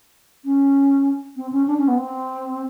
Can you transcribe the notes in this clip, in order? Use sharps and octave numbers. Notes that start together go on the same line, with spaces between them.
C#4
C4
C#4
D4
C#4
B3
C4